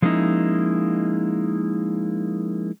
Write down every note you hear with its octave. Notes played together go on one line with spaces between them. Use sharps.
F3 G#3 A#3 C#4 D#4 E4